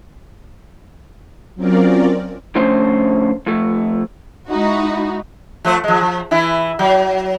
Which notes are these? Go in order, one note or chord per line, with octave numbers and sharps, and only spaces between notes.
F#3 C4 C#4 F4 A#4 D5
F2 D3 A3 C#4 C5
F2 A3
G#3 D#4 E4 F#4
F3 A3 C5
F3 G#3
F3
E3 E4
F#3